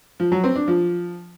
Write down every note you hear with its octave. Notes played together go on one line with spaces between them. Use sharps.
F3
F#3
C4
D4
F3